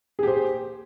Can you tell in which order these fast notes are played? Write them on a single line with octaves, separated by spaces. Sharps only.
G#4 G4 C5